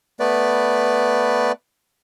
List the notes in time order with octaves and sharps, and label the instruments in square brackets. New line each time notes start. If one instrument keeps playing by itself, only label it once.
[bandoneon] A3 B3 B4 D5